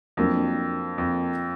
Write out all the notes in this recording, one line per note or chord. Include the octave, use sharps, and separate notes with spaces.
F2 F#3 A#3 D4
F2